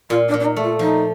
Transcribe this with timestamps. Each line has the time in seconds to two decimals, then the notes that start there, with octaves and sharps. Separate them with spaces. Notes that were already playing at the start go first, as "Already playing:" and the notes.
0.10 A#2 F4
0.28 D4
0.34 A#2
0.40 D4
0.45 D#4
0.56 A3
0.62 F4
0.79 F3 D#4